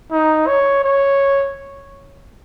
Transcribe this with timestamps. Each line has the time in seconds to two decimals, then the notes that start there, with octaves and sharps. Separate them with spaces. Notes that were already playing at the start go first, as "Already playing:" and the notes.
0.11 D#4
0.47 C#5
0.84 C#5